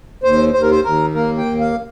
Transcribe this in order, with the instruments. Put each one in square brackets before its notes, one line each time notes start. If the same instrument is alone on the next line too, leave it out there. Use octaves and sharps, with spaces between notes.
[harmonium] D#2 C5
D#2 C5
A#4
C5
D#2 A#4
A#3 A#4
G5
D#2
F5